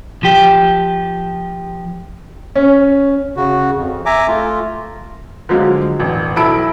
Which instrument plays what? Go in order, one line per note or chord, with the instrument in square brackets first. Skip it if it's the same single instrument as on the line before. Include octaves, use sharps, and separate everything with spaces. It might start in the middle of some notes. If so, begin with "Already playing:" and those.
[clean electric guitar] F3 G4
[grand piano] C#4
[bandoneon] C#3 F#4
F2
E5 G#5 A#5 D6
A3 F4
[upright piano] D3 F3 F#3 G#3 F5
E1 A1
B1 E4 A4 B5 E6 D7